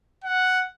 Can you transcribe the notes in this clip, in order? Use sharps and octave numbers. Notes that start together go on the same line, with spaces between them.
F#5